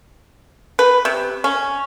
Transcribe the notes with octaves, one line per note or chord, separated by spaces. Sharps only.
B4
C3
C#4